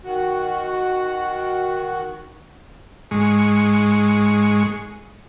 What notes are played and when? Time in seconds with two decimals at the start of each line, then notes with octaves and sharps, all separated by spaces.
0.04 D#3 F#4
3.11 G#2 G#3 C#6